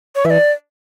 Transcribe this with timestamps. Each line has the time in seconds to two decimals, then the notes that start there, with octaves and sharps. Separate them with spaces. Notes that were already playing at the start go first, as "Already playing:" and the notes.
0.15 C#5
0.25 E3 E5
0.30 D5